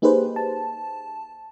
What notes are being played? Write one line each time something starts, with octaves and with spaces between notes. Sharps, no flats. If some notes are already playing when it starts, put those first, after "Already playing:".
A#3 D#4 G4 G#4 B4 C5
A5